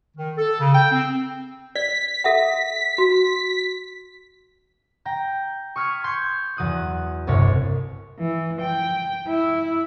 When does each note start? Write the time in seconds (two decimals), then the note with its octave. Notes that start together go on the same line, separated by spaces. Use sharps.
0.17 D#3
0.37 A4
0.59 C#3
0.73 G5
0.91 C4
1.75 D5 B6
2.24 A4 E5 F#5
2.98 F#4
5.05 G5 A#5
5.76 C#6 D#6 F6 G#6 B6
6.04 C6 C#6 G6 G#6
6.57 E2 F#3 D#6 F#6
7.27 G1 C2 C#5
8.19 E3
8.61 G5
9.28 E4